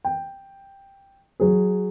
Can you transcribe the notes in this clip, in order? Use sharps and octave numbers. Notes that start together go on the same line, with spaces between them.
G5
F#3 G#4